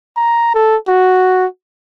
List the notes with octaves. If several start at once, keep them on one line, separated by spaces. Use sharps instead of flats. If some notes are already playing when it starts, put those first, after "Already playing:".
A#5
A4
F#4